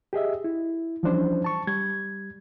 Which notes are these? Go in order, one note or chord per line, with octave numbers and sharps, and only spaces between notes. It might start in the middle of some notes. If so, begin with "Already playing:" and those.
G4 G#4 D#5 E5
E4
E3 F3 G3 C#4 D4 C5
A5 C#6
G3 G#6